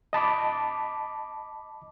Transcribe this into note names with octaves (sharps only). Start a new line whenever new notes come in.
D#5 A5 B5 D6